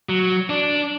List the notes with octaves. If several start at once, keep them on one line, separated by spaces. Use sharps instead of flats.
F#3
D4